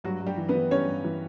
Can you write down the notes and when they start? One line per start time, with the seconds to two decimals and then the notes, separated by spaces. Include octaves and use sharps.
0.04 G2 F#3 F#4
0.20 G2
0.26 G3 G4
0.38 E3
0.49 B3 B4
0.55 E3
0.71 G2 C#4 C#5
0.87 G2
1.04 E3